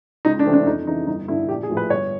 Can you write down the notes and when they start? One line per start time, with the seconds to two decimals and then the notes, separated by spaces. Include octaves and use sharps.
0.25 C#2 D#4
0.39 D4
0.45 C3 E3 A3 C4
0.53 D4
0.66 F2 D#4
0.86 C#3 E3 D#4
1.07 G1 D#4
1.28 G2 D3 E4
1.49 A#1 G4
1.63 G#4
1.70 A2 F3
1.77 B4
1.90 G1 C#5